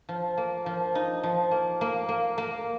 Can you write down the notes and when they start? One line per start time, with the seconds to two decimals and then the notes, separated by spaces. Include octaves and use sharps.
0.09 F3
0.37 A#3
0.66 F3
0.95 D#4
1.23 F3
1.51 A#3
1.81 A#3
2.09 A#3
2.38 A#3